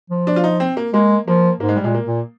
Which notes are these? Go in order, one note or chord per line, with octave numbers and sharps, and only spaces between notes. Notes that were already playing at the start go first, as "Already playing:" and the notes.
F3
D4
F4
D#4
C4
A#3
G#3 A#3
F3 A#3
G#2 A#3
G#3
G3
A#2 G#3
A#3
A#2